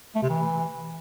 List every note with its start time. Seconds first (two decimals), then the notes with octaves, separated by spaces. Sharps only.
0.15 A3
0.22 C3
0.30 E3